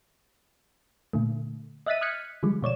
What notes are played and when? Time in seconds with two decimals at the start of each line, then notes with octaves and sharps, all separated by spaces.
1.13 A#2 D3 A3
1.86 D#5 E5 F#6 A6 B6 D#7
2.01 D#6 F6 F#6 G#6 B6 C#7
2.43 D3 F3 G3 G#3
2.62 B2 C#5 D5 E7